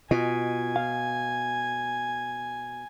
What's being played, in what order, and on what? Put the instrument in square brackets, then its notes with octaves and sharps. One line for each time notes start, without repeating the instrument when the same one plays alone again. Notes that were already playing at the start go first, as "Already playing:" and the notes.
[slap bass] B2 [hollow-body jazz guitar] F4 D#5 [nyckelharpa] G#5
[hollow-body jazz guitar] F5